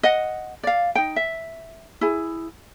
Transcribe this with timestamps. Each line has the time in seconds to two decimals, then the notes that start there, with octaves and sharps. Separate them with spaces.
0.03 D#5 F#5
0.63 D5 F5
0.95 D#4 G5
1.16 E5
2.01 E4 G#4